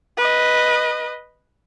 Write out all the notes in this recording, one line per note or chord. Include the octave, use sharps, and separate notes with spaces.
B4 D#5